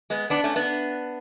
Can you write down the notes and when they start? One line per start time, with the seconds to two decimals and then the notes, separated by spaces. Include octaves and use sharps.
0.10 G#3 B3
0.30 B3 D4
0.44 A3 C#4
0.56 B3 D4